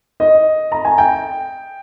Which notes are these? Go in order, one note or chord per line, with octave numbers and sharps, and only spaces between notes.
D#5
A#5
G#5
G5